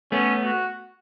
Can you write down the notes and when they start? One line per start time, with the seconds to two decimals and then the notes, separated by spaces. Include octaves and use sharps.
0.12 A3 B3 C#4
0.44 F#4